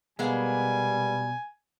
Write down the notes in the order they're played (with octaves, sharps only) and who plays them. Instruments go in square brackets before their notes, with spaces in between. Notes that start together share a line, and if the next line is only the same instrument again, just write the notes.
[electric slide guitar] B2 [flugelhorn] G3 [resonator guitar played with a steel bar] G#3 A#3 B3 [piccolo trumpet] G#5